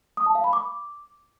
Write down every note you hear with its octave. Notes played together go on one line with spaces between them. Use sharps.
D#6
A5
F5
B5
D6